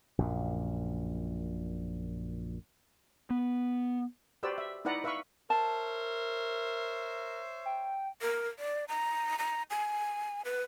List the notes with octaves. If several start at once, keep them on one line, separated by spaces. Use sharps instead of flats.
A#1 F#2 A#2
B3
F#4 G4 B4 C5 D5 E6
E5
D#4 E4 B4 D5 F#5 A#5
B4 E5 F5 B5 C#6
A#4 C5 C#5 E5 A5
G5
A#4
D5
A#5
A#5
G#5
B4